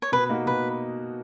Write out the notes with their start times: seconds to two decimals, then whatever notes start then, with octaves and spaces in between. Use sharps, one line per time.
0.02 C#5
0.12 B2 B4
0.29 A#3 D#4 F#4
0.46 B2 B4